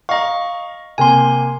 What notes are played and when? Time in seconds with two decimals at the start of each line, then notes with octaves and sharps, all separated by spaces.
0.09 D#5 F5 A#5 C#6
0.98 C3 A#3 G#5 C6